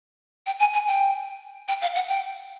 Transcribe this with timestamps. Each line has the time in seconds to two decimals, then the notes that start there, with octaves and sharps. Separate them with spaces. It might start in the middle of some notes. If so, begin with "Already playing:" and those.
0.46 G5
0.60 G#5
0.74 G#5
0.87 G5
1.68 G5
1.82 F5
1.95 F#5
2.08 G5